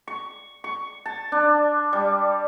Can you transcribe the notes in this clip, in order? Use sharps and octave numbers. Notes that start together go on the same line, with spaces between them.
C#6
C#6
A5
D4
G3